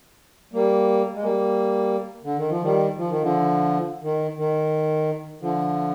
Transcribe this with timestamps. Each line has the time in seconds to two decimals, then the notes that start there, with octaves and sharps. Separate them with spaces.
0.53 G3 A#3
1.15 G#3
1.23 G3 A#3
2.24 D3
2.38 D#3
2.49 F3
2.62 D#3 G3
2.97 F3
3.10 D#3
3.22 D3 F3
4.02 D#3
4.37 D#3
5.41 D3 F3